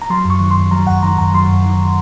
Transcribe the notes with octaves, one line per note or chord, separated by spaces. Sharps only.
A#5
F#3 C6
F#2
C#6
D#3
C6
F#2
F#3 A#5
F#2 F#5
D#3 A#5
F#2 A#5
F#3 C6
F#2
D#3